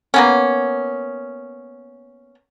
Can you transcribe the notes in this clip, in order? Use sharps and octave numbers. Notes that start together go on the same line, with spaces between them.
A#3 B3 C#4